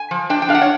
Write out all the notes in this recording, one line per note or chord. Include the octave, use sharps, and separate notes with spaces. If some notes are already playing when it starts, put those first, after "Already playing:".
Already playing: G#5
F3
D4 G5
G5
D4 F5
F#5
C#5